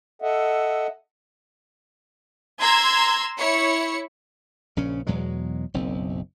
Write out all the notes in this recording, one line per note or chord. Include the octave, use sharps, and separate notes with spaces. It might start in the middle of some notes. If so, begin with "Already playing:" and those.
A4 D#5 E5 F#5
A#5 C6 E6 G#6
E4 C#5 C#7
A#1 C#3 C#4
E2 B2 F#3 G#3
F#1 B1 C4